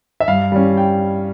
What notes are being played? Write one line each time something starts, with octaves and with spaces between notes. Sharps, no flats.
E5
G2 F5
G3 C#4
G5